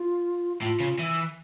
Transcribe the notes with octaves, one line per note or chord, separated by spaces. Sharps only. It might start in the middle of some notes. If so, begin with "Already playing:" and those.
Already playing: F4
A2 F4
C#3
E3